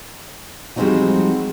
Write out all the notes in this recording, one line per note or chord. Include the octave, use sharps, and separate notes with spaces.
F3 G3 G#3 C4 D#4 F#4